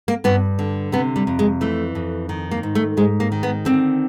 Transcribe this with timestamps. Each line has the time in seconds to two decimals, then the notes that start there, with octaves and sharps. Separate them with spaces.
0.08 A#3
0.24 G2 B3
0.59 D3
0.92 C3 B3
1.16 G3
1.27 F2
1.39 G#3
1.61 E3 A3
1.95 F2
2.29 D#3
2.51 A#3
2.63 G#2
2.75 A3
2.97 G#2 G#3
3.20 A#3
3.32 D#3
3.43 B3
3.65 D3 C4